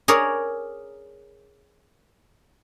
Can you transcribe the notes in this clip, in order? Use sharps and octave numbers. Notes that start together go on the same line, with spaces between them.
G#4 A#4 C#5 D5